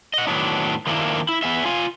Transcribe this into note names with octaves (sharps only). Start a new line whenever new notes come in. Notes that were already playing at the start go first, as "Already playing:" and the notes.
D#5 F#5
A2 D#3 F#3 B3 D4 D#4
D#3 F3 A3 A#3 D4 E4
E4
B3 G#4 E5
F4 F5 G#5